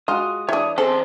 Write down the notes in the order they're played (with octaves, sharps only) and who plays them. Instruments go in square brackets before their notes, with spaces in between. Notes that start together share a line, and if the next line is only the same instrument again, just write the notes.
[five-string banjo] G#3 F#4 [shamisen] F4 [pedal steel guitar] D#6
[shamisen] E3 D4 [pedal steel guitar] C#5 D#6
[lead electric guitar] E2 C5 [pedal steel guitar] C4 [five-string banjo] G#4 [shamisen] A4